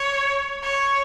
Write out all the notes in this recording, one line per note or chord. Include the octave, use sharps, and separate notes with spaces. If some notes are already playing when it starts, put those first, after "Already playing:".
Already playing: C#5
C#5